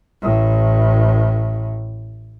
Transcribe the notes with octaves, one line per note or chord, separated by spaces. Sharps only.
A1 A2